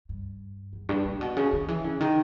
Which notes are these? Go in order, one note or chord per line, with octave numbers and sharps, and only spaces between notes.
G2
E2
G2
A#2
B2
C#3
D#3
E3
C#3
D#3